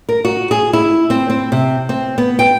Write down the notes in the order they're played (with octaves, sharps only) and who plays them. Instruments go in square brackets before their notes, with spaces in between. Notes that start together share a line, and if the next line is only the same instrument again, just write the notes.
[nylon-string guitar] A#4
F#4
G#4
E4
C4
C4
C3
C4
B3
G5